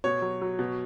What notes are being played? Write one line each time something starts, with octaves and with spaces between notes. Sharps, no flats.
B2 C#5
F#3
F#3
B2